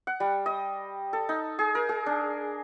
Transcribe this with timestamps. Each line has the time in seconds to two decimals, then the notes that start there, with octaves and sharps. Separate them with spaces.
0.07 F#5
0.20 G3
0.46 D#5
1.13 A4
1.29 D#4
1.59 G#4
1.75 A#4
1.89 G#4
2.06 D4